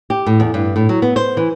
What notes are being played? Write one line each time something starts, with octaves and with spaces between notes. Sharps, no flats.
G4
A2
E2
G2
A2
F#3
B3
C5
E3